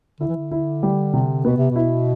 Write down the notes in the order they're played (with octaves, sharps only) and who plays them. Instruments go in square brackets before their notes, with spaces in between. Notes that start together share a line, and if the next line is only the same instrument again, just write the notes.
[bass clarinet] D3 [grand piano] E4
[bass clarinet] E3
D3
[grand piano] E4
G3
C3
[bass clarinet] B2 [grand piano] B3
[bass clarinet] C3
[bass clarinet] B2 [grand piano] E4